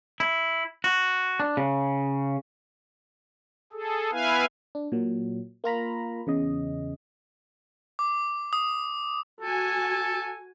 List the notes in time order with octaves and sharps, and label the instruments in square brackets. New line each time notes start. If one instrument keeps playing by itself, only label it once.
[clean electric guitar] E4
F#4
D4
C#3
[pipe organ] G#4 A4
B3 E4 B4 F5 G#5
[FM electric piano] D4
A#2 F#3
A#3 F4 A#5 B5
E2 C#3 D#5
[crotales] D6
D#6
[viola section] F#4 G#5 [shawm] A4